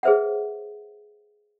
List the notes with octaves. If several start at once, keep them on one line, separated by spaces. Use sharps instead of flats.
G#4 B4 C5 E5 F#5